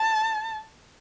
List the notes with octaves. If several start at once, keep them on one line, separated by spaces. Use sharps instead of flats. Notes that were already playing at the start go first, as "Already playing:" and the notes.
Already playing: A5